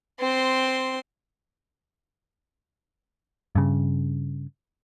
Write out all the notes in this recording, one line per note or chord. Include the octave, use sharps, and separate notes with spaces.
C4 C6
G2 C#3